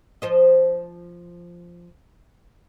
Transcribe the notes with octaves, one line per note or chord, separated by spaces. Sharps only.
F3 C5 D#5